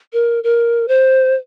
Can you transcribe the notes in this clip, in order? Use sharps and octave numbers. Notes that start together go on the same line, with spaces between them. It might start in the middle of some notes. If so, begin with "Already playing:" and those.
A#4
A#4
C5